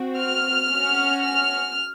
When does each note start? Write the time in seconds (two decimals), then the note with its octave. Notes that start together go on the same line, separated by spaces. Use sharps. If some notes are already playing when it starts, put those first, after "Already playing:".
Already playing: C4 F#4
0.19 F6
0.71 C#4 F#4
1.23 F6